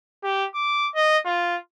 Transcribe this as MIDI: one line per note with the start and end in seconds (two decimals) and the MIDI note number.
0.24 0.46 67
0.55 0.89 86
0.95 1.18 75
1.25 1.57 65